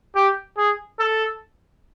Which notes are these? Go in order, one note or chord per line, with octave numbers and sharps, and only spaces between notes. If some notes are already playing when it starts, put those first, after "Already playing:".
G4
G#4
A4